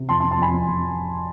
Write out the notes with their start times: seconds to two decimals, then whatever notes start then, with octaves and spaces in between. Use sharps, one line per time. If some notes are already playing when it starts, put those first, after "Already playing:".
Already playing: C3
0.09 F2 A5 C6
0.20 F2 A5 C6
0.31 A5 C6
0.38 F2 G#5 B5
0.53 F2
0.68 F2